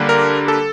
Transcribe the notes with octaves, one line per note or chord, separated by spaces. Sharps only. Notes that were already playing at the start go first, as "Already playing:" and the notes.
Already playing: D3 G3 A#3 D4
A#4
A4